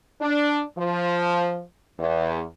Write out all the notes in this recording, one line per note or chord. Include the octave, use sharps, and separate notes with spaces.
D4
F3
E2